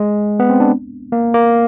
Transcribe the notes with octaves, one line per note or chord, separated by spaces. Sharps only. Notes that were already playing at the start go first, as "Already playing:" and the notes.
Already playing: G#3
B3
C4
D4
A#3
A#3